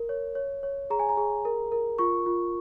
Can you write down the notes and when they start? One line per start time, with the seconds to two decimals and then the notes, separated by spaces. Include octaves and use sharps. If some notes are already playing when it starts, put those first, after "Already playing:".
Already playing: A#4
0.09 C#5
0.35 C#5
0.63 C#5
0.90 G#4 A#5
0.99 G#5
1.09 A#5
1.17 G#4
1.45 A#4
1.72 A#4
1.99 F4 C#6
2.26 F4